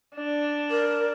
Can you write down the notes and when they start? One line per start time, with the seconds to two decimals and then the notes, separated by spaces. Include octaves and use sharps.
0.16 D4
0.71 A#4